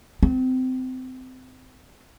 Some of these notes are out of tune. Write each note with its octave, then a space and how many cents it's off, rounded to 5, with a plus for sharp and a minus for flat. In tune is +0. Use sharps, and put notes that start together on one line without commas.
C4 -25